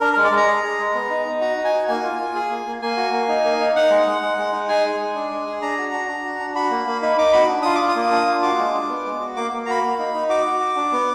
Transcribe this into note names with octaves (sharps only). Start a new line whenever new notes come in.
D4 A#4
G#3 A#4
D5
G#3
A#5
G#4
G#4
G#3
B3
D#4
D#4
F#4 A#5
D#4
G#5
F#4
A#3 G#5
F4
F4
G#4
A#3
A#3
A#3 G#5
F#4
A#3
D#4
A#3
D#4
D#4 F#5
G#3
G#3
G#3
G#3
D#4
G#4 G#5
G#3
G#3
D4
G#3
G#4
D4 A#5
F#4
D4
D4
F#4
D4
F#4 B5
A#3
A#3
D#4 B5
D#4 D6
F#4 B5
D4
F4 D#6
F4 D6
D#6
A#3
D4
F4
F#4 D6
G#3
D4
B3
G#3
F#4
A#3 D6
A#3
F#4 A#5 B5
A#3
D#4
D#4
F#4 D6
F#4
F#4
D4
B3